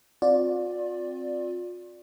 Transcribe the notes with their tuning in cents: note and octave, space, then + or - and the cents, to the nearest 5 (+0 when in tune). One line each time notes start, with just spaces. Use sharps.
C4 +5 F4 +40 D5 +0